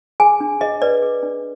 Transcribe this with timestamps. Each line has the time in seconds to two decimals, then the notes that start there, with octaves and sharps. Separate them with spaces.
0.20 G#4 G#5
0.40 D4
0.61 G#4 D#5
0.82 B4 D5
1.02 G#4
1.23 D4